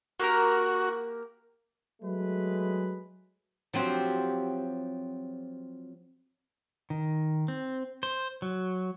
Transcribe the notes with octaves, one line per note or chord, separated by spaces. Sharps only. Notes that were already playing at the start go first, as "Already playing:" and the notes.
A#3 F#4 G4 A#4
F#3 G#3 A3 B4
F3 F#3 C4 F4 G4
D#3
C4
C5
F#3